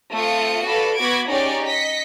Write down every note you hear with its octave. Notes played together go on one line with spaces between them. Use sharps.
A3 C4 F4 D#6 C#7
F#4 A4 B4 D5 F5 B5
B3 F#4 B5 D6 G#6 D7
C#4 D#4 G4 G#4 C#5 D5
D#5 B6 C#7